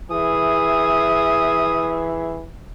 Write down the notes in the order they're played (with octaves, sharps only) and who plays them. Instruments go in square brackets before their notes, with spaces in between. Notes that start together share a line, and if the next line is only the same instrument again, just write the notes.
[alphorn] E3 [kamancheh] G#4 E5 [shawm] D#6